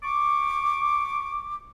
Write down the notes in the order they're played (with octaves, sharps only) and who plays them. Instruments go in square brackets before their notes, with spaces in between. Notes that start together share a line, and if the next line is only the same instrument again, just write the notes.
[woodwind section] C#6 D6